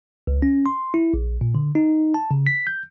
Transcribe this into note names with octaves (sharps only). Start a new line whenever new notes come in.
C#2
C#4
C6
E4
A#1
A#2
D3
D#4
A5
C#3
B6
G6